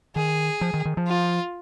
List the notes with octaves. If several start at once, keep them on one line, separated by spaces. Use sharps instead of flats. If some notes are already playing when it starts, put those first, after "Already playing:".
D#3 G#4
F3
D#3
D#3
F3
F4